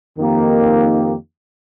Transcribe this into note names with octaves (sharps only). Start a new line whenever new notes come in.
F2 D#3 A#3 D#4 G4